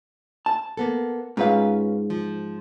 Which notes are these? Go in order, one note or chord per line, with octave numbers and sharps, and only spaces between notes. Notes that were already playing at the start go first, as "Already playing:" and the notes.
A5
A#3 B3 A4
G#2 C#4 F4 B4 F5
F3